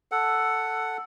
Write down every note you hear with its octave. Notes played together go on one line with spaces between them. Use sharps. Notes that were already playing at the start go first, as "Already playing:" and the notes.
A4 F#5